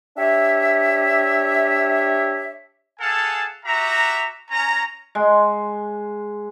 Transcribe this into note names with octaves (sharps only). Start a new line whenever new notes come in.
D4 G4 C#5 E5
G#4 A4 F5 F#5 G#5 A5
F#4 G4 E5 A#5
C#4 A#5
G#3